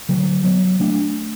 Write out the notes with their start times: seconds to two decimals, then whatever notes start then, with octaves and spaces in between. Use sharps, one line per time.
0.09 D3 F#3
0.44 F#3 B3
0.80 A3 D4